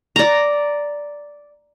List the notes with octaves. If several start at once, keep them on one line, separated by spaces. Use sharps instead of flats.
D5 A#5